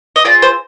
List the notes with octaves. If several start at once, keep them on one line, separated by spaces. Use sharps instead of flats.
D#5
C4 F4 G#4 D5
C5